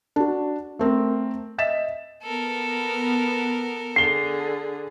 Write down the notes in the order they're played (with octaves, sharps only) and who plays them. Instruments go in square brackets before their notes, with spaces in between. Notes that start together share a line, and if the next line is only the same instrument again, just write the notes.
[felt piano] D4 F#4
A3 C4 A#4
D#5 E5 A6 B6 E7
[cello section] B3 [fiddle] A4 A#4
[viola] D3 G#4 [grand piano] C7 G7